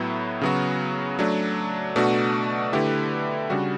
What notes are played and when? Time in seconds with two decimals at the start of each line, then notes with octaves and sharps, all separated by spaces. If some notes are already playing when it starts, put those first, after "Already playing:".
Already playing: A2 F#3 B3 E4
0.41 C#3 F#3 B3 F#4
1.19 F#3 A3 D4
1.96 B2 A3 D4 F#4
2.73 D3 A3 E4 G4 B4
3.50 C#3 G3 D4 F#4